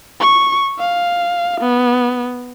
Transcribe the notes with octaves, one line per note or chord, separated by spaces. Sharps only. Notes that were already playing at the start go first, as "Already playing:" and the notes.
C#6
F5
B3